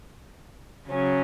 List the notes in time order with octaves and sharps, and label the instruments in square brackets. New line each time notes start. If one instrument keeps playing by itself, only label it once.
[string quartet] C#3 F#3 C#4